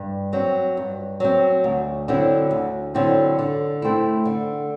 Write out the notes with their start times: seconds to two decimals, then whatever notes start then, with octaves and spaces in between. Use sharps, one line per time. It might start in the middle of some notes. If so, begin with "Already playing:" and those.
Already playing: G2
0.33 F#3 C4
0.77 G2
1.20 F#3 C4
1.64 D2
2.08 D3 F#3 C4 E4
2.51 D2
2.94 D3 F#3 C4 E4
3.39 D3
3.82 A3 C4 E4
4.25 D3